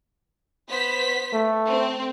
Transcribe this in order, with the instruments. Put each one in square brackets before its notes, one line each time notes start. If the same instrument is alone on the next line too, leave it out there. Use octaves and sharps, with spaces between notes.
[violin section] B3 C5 B6
[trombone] A3
[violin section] C4